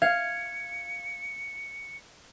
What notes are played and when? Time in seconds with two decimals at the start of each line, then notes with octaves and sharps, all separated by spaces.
0.02 F5 G#6 C#7